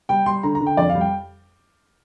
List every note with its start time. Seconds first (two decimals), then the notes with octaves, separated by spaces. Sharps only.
0.09 G3 G5
0.26 G3 C6
0.43 D3 A#5
0.55 A#5
0.61 D3
0.66 G5
0.77 F2 D5
0.89 F5
0.95 G3
1.01 G5